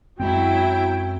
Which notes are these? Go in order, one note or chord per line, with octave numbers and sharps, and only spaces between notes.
F#2 F#3 G#3 C4 E4 G5